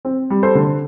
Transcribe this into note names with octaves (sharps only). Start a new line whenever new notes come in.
C4
G3
A4 C5
D3